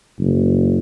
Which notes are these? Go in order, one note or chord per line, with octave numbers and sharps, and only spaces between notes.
F#1